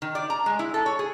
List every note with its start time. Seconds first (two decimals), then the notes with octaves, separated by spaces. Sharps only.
0.02 D#3
0.15 D5
0.30 A#5
0.46 G#3
0.59 E4
0.74 A4
0.86 C#5
0.99 G#4